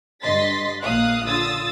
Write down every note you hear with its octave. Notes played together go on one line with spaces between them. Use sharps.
G2 D3 D#5 C6 A6 B6
A#1 A#3 F5 D#6 F#6
D3 F4 D#6 E6 A6